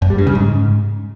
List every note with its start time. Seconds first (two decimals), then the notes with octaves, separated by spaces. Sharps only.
0.02 F#2
0.10 G3
0.18 G2
0.27 C#3
0.35 G#2